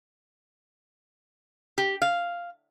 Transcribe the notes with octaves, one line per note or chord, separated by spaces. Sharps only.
G4
F5